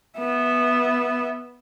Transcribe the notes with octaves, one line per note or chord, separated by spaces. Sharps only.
B3 E5